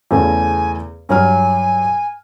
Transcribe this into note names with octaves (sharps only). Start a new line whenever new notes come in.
E2 C#3 A3 G#5
G2 F#3 G#5 F6